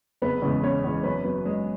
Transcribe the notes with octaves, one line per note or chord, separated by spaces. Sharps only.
F#1 B3 B4
E2 C#3 G#3
F#1 C#4 C#5
E2 C#3 G#3
F#2 B3 B4
F#3 B3 B4
F#2 G#3 G#4